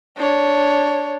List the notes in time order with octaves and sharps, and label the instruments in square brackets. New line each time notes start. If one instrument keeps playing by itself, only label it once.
[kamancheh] D4 C#5